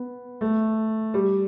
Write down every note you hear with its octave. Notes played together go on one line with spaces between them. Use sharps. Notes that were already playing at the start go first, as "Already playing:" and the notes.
Already playing: B3
A3
G3